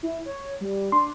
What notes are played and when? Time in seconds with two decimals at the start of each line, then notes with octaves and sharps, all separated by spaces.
0.03 E4
0.26 C#5
0.61 G3
0.92 D4 C6